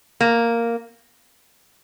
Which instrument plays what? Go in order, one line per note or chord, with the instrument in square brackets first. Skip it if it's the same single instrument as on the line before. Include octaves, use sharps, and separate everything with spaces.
[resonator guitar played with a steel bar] A#3